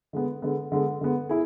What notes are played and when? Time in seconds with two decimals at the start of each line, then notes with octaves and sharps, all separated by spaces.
0.13 D3 G#3 B3
0.42 D3 G#3 B3
0.72 D3 G#3 B3
1.01 D3 G#3 B3
1.29 E4 G#4